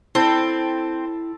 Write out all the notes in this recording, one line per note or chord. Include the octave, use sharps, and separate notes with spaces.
C4 E4 A4 A5 B5